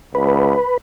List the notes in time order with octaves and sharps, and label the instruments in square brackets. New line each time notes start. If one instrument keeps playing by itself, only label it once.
[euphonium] C#2 [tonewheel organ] B4